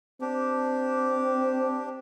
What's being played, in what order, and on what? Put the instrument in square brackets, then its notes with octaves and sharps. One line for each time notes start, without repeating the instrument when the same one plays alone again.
[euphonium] C4 [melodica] D4 G4